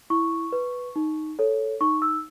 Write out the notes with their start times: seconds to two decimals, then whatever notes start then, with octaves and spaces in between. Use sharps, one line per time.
0.10 E4 C#6
0.52 B4
0.96 D#4
1.39 A4 C#5
1.81 D#4 C#6
2.02 E6